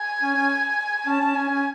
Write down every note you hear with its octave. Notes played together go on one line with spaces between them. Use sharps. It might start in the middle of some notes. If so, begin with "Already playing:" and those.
Already playing: G#5
C#4
C#4
C#4 A5
C#4
C#4 G#5
C#4